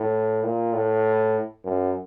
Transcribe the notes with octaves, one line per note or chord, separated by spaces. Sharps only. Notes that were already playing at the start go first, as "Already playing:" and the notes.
Already playing: A2
A#2
A2
F#2